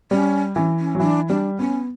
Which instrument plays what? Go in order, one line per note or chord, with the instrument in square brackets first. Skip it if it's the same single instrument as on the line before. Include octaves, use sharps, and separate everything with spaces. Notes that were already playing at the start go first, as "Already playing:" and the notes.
[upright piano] G3 [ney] C#4
[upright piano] E3 [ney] C#4
[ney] C#4
[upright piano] F#3
[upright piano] E3 [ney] D4
[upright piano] G3 [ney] D4
[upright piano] B3 [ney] C#4